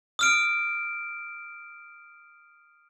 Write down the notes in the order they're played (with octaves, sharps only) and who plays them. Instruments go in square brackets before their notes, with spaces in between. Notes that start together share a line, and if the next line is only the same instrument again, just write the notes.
[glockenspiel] D#6 F6 D7